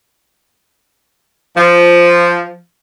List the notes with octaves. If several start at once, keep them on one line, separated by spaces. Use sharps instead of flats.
F3